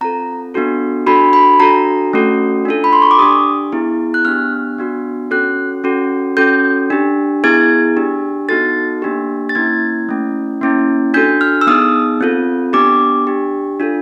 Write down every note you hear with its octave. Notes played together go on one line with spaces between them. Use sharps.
C4 F4 A4 A#5
B3 D4 F#4 A4
D4 F#4 A4 B5
B5
D4 F#4 A4 A#5
A3 C#4 F#4 A4
D4 F4 A4
B5
C6
C#6
D6
D4 G4 D#6
B3 E4 G#4
F#6
B3 D4 G4 F6
B3 D4 F#4
C#4 F#4 A4 F#6
C#4 F#4 A4
C#4 F#4 A4 G6
D4 G4
B3 E4 G#4 G#6
D4 G4
B3 D#4 F#4 A4 A6
A#3 D4 G4
A6
A#3 C#4 E4 G#6
A3 C#4 E4
A#3 C#4 E4
D4 F#4 A4 G6
F6
E6
B3 D#4 G#4 D#6
C4 F4 A4
B3 D4 G4 D6
D4 G4
D4 F4 A4